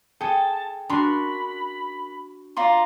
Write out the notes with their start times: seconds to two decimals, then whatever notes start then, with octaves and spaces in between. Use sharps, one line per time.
0.21 G#4 A4 G5 A5
0.89 D4 F#4 A#4 B5 C6
2.57 F4 D5 A#5 C6